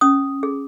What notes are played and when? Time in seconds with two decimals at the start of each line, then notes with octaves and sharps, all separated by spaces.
0.01 C#4 D#6
0.43 G#4